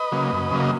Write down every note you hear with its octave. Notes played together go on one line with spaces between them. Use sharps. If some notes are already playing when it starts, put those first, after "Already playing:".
Already playing: B4 D#5
C#3 F#3 A#3
F#2
C#3 F#3 A#3
D#5